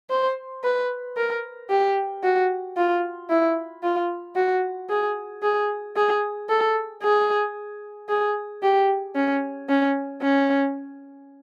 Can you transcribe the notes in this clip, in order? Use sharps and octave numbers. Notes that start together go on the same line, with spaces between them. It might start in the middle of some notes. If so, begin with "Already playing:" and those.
C5
B4
A#4
G4
F#4
F4
E4
F4
F#4
G#4
G#4
G#4
A4
G#4
G#4
G4
C#4
C#4
C#4